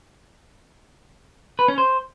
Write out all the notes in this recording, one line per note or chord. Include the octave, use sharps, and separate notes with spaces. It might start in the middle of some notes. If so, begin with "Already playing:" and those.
B4
C#4
C5